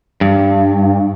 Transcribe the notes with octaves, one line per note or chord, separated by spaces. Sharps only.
G2